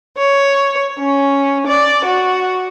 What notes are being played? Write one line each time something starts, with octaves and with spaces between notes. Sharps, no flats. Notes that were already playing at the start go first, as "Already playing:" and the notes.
C#5
C#4
D5
F#4